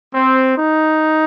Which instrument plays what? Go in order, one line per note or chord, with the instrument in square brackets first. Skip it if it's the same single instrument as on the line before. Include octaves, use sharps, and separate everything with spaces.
[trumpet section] C4
D#4